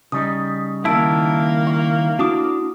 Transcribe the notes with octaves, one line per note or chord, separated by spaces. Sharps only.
C#3 G3 D#4 D#6
D#3 A#3 E4 A5 E6 D7
F5 C#6
D4 E4 F#4 D6 D#6